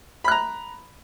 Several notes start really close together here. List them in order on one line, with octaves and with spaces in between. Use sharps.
B5 F#6 A#5